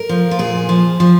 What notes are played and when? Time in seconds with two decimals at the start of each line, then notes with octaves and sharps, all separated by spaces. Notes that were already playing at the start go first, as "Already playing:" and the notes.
Already playing: A#4
0.09 F3
0.31 F4
0.39 A#2 G#4
0.69 F3
1.00 F3